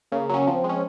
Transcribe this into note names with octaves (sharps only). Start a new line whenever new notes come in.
C#3 A#3
F#3 C#4
F3 C4
G#3
C#4